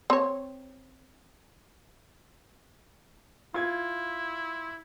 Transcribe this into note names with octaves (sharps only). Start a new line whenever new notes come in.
C4 C#5
E4 F4 G#6